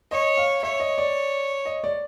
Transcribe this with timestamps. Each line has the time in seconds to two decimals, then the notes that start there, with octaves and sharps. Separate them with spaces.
0.11 C#5 D#5
0.37 F5
0.63 C#5 E5
0.80 D#5
0.98 D5
1.65 D#5
1.84 D5